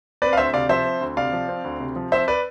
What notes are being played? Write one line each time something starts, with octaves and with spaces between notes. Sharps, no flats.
C4 B4 D5
F5
D2 C5 E5
C3 D5 F5
F3 C5 E5
C4
D2
C3 D5 F5
F3
C4
D2
C3
F3
C4 C5 E5
B4 D5